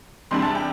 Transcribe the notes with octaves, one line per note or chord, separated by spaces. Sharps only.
E2 C3 G3 D4 C6
A5
G5